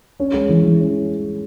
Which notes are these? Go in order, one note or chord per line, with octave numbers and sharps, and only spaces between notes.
C#4
G#3
E3
E3
C#4